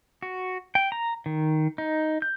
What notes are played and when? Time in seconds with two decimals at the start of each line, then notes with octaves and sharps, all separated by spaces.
0.22 F#4
0.75 G5
0.92 A#5
1.26 D#3
1.78 D#4
2.22 G6